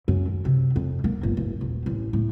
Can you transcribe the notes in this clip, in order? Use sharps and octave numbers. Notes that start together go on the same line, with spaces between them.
F#2
D#3
C3
F2
A#3
G1
D1
D#1
A1
A2